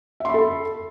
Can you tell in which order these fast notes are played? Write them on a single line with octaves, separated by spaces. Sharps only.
E5 C6 B5 A4